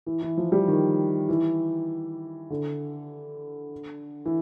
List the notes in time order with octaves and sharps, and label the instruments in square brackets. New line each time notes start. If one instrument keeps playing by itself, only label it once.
[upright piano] E3
E3
F3
G3
D#3
E3
D3
E3